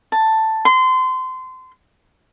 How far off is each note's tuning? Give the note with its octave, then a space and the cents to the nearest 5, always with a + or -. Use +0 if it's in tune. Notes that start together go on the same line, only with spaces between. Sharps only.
A5 +5
C6 -25